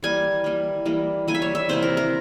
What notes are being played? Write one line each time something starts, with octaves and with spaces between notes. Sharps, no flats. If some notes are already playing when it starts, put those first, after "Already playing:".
E3 G3 A#3 G#5
E3 G3 A#3
E3 G3 A#3
E3 G3 A#3 G#5
E5
C#5
E5
C3 E3 A#3 C5
A#4
A#4